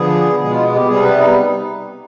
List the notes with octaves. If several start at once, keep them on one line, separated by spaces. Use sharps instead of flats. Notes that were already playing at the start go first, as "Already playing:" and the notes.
Already playing: D3 F3 B3 G#4
B2 G#3 B3 G#4
F4
G4
C3 G3 B3 G#4
B4
D#4